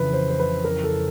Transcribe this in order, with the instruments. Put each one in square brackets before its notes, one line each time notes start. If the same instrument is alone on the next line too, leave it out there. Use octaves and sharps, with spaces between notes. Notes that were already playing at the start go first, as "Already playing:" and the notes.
Already playing: [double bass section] F2 C#3 E3 [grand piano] B4
[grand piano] C5
C5
B4
A#4
A4